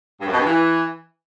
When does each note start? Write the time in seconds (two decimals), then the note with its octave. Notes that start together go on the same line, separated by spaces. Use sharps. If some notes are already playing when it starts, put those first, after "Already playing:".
0.21 G2
0.27 F#2
0.33 B2
0.39 G2
0.45 E3